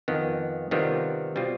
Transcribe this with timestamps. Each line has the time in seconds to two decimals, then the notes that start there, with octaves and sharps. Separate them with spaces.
0.08 F2 D#3 B3
0.71 C3 D#3 G3 B3 F4
1.36 B2 G3 C4 F4